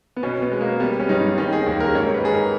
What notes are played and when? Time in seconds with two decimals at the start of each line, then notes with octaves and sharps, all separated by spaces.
0.16 B3
0.23 B2 C#4
0.42 B3
0.51 G#3
0.61 A#3
0.80 G3 B3
1.00 C#4
1.09 G2 D#4
1.38 D#3 C#4
1.52 G#4
1.66 D#2
1.80 A#4
1.95 G#2 C#5
2.14 B4
2.24 G#2 G#4
2.33 A#4